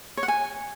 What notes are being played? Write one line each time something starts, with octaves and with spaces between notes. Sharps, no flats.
C#5
F#5
G#5